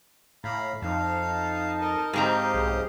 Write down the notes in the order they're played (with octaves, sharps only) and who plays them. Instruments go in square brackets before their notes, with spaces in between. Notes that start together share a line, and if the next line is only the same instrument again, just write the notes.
[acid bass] A2 [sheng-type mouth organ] F5 A#5 B5
[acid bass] F2 [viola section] D#4 A5 [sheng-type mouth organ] F5
[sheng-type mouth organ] A#4 D#5
[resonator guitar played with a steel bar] G#2 C4 A#5 [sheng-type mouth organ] G4 D#5 F5
[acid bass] B1 [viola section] G#4